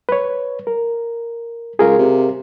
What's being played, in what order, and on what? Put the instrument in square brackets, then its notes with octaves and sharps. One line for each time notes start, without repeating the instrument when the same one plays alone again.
[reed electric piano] B4 C#5
A#4
[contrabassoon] C#2 [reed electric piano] G#4 A#4 F5
[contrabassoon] C3